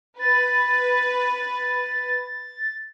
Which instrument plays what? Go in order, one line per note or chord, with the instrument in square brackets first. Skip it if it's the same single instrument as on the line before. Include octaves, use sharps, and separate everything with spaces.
[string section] B4 [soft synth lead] A6